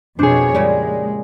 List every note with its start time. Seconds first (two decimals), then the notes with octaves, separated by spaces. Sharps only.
0.19 F2 B2 D4 G#4 C5 C#5
0.55 A#2 C#3 G3 G#3